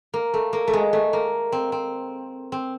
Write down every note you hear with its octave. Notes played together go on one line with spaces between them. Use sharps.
A#3
A3
A#3
A3
G#3
A3
A#3
C4
C4
C4